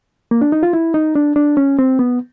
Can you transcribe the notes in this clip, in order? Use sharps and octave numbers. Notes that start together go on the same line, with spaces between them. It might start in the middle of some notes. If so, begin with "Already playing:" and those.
A#3
D4
D#4
F4
E4
D#4
D4
D4
C#4
C4
B3